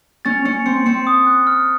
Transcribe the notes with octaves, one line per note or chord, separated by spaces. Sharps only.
C#4 A6
C#4 C#7
C4 C#7
C4 C#7
D#6
F#6
F6